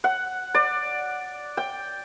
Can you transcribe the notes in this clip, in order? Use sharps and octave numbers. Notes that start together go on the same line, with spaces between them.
F#5
D5
G5